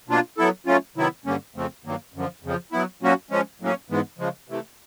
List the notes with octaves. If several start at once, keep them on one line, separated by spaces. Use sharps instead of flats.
B2 F#3 A#3 D4 F4
F#3 B3 E4 A4
F#3 A3 C#4 F4
C3 D#3 F#3 B3 E4
G2 D3 G3 A#3 C#4
F2 C#3 F3 A3 C4
G2 D#3 F#3 A#3
F#2 D3 F3
F2 C#3 F3
F#3 B3 E4
A#2 F#3 A#3 C#4 F#4
F3 G#3 C#4
A2 F#3 A#3 C#4
G#2 E3 G#3 B3
C#3 F3 G#3
C3 E3 A3